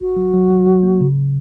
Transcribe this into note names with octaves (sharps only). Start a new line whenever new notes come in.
G#1 F#4
F#3
F#3
F#3
F#3
A#3
C#3